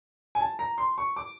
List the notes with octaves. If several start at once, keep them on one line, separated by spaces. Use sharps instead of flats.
G#5
A5
A#5
C6
C#6
D6